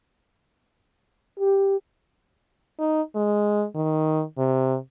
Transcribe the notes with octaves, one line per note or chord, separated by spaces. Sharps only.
G4
D#4
G#3
D#3
C3